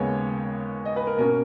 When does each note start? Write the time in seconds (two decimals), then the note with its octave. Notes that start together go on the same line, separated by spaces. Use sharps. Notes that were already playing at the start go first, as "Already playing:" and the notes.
Already playing: D#2 C#3 G#3 B3 C#5
0.85 D#5
0.96 B4
1.07 A#4
1.18 B2 A#3 C#4 A#4